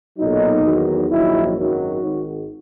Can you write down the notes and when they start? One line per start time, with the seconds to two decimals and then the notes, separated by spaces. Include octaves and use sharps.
0.18 B1 A#2 F#3 D#4
0.64 E2 D#3 F#3
1.10 A#1 G#2 D#3 F#3 E4
1.56 G#1 F#2 D#3 F#3 F#4
2.02 G#1 G#2 D#3